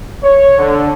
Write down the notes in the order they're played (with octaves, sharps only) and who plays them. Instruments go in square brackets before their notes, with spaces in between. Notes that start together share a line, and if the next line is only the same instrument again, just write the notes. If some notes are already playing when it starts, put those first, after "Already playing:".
[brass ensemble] C#5
D3